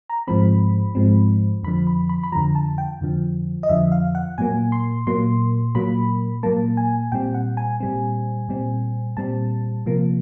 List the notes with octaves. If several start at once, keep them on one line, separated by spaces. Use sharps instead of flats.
A#5
G#2 F3 G#3 C4 B5
G#2 F3 G#3 C4
F2 D3 F3 B5
B5
B5
B5
F2 D3 F3 A#5
A5
G5
F2 D3 F3
D#5
F2 D3 F3 E5
F5
F#5
A#2 F#3 A#3 G#5
C6
A#2 F#3 A#3 C6
A#2 F#3 A#3 B5
A#2 F#3 A#3 A5
G#5
A#2 G3 C4 G5
F#5
G#5
A#2 G3 C4
A#2 G3 C4
A#2 G3 C4 A5
C3 F3 A#3